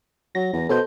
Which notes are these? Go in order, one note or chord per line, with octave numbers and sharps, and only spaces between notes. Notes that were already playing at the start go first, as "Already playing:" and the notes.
F#3 A#6
E2
B2 A4 C5 G6